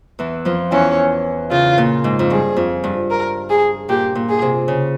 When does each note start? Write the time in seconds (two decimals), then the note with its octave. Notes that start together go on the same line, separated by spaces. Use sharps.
0.19 E2 E3
0.45 F2 F3
0.72 E2 E3 C#4
1.51 C#3 F4
1.78 A#2
2.04 G#2
2.19 F2
2.30 G2 G#4
2.56 F2
2.84 G2
3.10 A#4
3.50 G#4
3.89 A#2 G4
4.15 A#2
4.29 G#4
4.42 C3
4.68 C#3